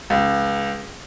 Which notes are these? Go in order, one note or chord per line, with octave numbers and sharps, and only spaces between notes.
C#2